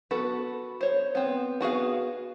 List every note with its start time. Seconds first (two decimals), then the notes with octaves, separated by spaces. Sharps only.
0.11 B3 F#4 A4 B4
0.81 C5 C#5
1.15 B3 C4
1.61 B3 F#4 G#4 F5